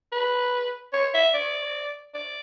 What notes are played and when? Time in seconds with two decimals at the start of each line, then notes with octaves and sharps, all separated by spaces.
0.12 B4
0.93 C#5
1.14 E5
1.34 D5
2.14 D5